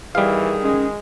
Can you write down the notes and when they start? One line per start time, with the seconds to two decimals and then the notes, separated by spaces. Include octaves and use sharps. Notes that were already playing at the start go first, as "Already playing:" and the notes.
0.15 D#3 E3 G3 G#4 F5
0.62 G#3 C#4